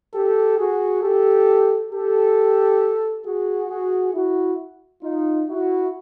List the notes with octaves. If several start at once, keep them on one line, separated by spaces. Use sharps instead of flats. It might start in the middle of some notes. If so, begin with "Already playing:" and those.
G4 A4
F#4 G#4
G4 A4
G4 A4
F#4 G#4
F#4 G#4
E4 F#4
D#4 F4
E4 F#4